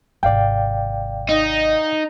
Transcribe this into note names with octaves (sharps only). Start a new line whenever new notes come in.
G#1 C3 D5 F5 G5
D#4